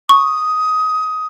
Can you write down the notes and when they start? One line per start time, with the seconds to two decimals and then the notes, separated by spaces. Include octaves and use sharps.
0.09 C#6 D#6